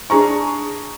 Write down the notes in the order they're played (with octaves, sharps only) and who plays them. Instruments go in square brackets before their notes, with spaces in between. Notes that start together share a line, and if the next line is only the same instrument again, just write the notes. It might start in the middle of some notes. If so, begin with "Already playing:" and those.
[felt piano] D4 G#4 A#5 C#6